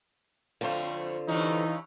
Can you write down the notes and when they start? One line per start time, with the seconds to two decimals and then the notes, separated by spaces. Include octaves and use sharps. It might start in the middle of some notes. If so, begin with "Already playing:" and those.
0.61 F2 D3 A3 C4 F4 C5
1.28 G2 C3 E3 C#4 D#4